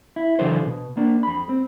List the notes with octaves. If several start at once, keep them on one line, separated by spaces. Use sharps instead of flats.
E4
C#3 E3 F#3 D4 A4 C5
B2
A#3 D4
F2 B5
C4